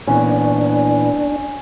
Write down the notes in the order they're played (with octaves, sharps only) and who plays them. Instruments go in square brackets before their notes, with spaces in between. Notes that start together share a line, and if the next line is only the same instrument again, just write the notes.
[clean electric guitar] A#2 E3 B3 [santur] C#4 [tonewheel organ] D4